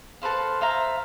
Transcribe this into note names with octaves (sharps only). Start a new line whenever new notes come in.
A4 B4 C5 F5
C5 E5 F5 A#5